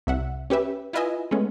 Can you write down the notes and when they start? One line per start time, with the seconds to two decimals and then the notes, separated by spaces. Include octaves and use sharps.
0.07 C2 E5 F#5
0.50 C#4 G4 B4 E5
0.93 E4 F4 B4 D#5 E5 G#5
1.31 G#3 A3 B3 C#4